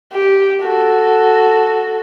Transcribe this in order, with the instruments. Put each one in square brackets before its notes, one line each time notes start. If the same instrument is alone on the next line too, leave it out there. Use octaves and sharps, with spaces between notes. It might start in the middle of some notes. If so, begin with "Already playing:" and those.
[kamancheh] G4
F#4 A4